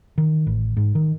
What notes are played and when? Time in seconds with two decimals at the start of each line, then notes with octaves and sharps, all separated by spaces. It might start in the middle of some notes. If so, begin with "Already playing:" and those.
0.18 D#3
0.47 A1
0.77 G#2
0.95 D#3